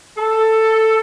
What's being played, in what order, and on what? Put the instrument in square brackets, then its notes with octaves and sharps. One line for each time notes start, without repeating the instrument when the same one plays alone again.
[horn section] A4